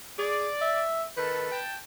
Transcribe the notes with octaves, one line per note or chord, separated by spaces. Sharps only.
G#4 D5
E5
D#3 A4 B4
G5 A5